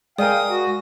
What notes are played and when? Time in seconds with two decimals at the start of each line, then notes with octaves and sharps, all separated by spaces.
0.18 G#3 A#4 D5 F5 G5 G#5 D#6
0.49 F#4